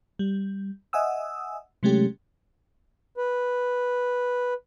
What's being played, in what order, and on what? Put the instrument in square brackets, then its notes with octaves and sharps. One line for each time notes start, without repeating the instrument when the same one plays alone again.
[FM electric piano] G3
D#5 E5 F#5 G#5 D#6 E6
C3 F#3 G#3 A3 C#4 G4
[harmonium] B4